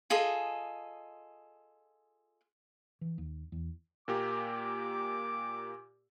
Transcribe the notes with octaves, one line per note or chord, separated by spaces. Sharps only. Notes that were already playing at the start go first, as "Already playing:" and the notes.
F4 G#4 A4 D#5
E3
D#2
E2
A#2 A#3 G4 D6